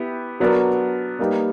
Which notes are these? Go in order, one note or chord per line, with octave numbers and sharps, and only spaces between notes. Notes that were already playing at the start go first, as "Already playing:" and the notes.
Already playing: B3 E4 G4 B4
F#3 B3 D4 F#4 A#4
G3 A#3 D#4 G4 B4